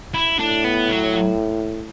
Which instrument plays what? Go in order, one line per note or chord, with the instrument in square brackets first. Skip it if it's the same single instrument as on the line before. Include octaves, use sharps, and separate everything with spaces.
[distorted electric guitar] E4
[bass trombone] A2 [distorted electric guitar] D4
[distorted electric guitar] B3
F#3